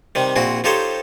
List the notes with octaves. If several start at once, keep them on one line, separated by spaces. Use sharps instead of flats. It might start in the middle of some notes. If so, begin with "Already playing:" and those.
C3 D#3 G3
A#1 A#2 C4 E4 F#4
F3 D#4 G4 A4 C5 C#5